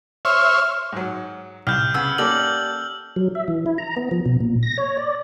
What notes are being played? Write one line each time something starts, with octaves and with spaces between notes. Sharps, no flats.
C5 C#5 E5 F6
G#2 F#3
C2 F6 G6
C#3 B3 E6
A#3 C#4 G4 A4 D5 F#7
F#3
E5
E3
E4
A#5
B3
F3
B2
A#2
A#6
C#5
D5